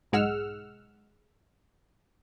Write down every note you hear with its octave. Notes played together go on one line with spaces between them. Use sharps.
B1 G#2 G#3 F#5 E6 F6